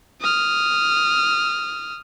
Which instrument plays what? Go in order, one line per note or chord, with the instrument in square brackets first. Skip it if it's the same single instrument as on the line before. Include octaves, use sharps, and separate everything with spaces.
[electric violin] D#6 F6